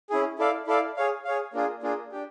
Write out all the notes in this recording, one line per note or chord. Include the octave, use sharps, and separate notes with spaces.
C#4 E4 G#4
E4 A4 D5 F5
E4 A4 D5 F5
G#4 C#5 F5
G#4 C#5 F5
A#3 D4 F4 G#4
A#3 D4 F4 G#4
D4 G4